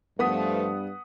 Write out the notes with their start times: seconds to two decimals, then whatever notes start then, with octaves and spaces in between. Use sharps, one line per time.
0.19 G2 F3 A3 B3 F#5 D#6 B6